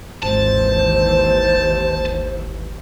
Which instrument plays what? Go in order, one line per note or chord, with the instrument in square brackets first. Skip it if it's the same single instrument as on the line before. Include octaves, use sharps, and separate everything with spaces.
[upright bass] G#1 F4 [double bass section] D#2 E3 [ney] C5 [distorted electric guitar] A5